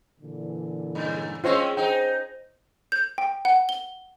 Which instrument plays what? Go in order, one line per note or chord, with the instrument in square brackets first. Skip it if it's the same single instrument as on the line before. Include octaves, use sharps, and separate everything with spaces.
[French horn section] A#2 D3 E3
[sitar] G2
[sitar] G#3 C4 C#4 [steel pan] F4 C5 C#5
[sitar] D#4 G#4 [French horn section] C5 [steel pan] G5
[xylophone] G6
G5
F#5
G7